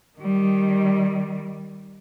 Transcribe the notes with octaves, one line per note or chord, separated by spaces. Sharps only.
D#3 G3